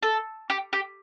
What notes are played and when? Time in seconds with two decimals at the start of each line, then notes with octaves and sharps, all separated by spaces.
0.03 A4
0.50 G4
0.73 G4